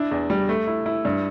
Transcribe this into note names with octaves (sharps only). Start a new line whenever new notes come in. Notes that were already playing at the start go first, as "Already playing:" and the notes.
Already playing: D4 E4
E2
G3
A3
E4
E4
G2